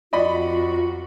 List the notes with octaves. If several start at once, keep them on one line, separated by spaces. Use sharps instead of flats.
F2 F4 F#4 D5 D#5 B5